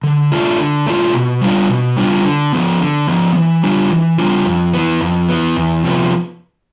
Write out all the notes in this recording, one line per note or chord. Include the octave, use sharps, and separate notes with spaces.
D3
A3 D4 F4
D3
A3 D4 F4
B2
G3 D4 F4
B2
G3 D4 F4
D3
F3 B3
D3
F3 B3
E3
G3 D4 F4
E3
G3 D4 F4
F2
E3 B3
F2
E3 B3
E2
C3 F3 B3